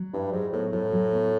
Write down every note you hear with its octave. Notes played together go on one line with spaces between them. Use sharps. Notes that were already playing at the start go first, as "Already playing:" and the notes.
Already playing: F#3
G2 E4
G#2 F#3
A2 B3
A2 F#3
F#3
B3